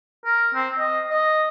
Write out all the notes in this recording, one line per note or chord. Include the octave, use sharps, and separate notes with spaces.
A#4
C4
D#5
D#5